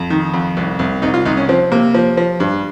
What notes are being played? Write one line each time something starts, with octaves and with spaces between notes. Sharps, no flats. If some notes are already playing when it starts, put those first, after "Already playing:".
Already playing: F2
D#3
F2
C2
C2
C2 D#4
F4
C2 D#4
C#4
F3 C4
C3 A#3
F3
F3
G2